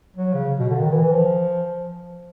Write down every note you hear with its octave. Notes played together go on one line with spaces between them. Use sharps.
F#3
C#3
B2
D3
D#3
E3
E3
F3